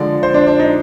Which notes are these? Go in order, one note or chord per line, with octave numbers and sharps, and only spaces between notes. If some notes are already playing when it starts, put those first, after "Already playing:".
Already playing: D3 F3 G#3 D5
C5
D4
D4
D#4